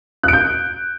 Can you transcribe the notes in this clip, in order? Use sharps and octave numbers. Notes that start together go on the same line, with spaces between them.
F#6 G6 D7